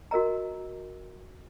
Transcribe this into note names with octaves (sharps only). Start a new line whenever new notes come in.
F#4 A#4 D#5 A#5